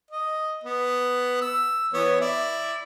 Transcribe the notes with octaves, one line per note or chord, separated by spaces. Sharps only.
D#5
B3
E6
E3 B3 C#5
E4 D5